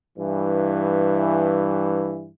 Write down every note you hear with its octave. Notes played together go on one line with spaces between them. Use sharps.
G2 E3